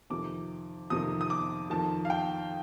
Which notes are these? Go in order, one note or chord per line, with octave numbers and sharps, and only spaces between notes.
F2 C3 D#3 D6
F2 C3 D#3 D#6
D#6
D6
F2 D#3 A5
F5
G5